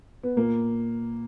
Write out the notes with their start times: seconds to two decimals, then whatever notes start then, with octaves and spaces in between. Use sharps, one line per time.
0.23 B3
0.37 A#2 A#3